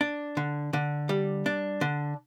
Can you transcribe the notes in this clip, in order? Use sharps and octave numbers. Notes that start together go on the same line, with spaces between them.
D4
D3
D3
G3
D4
D3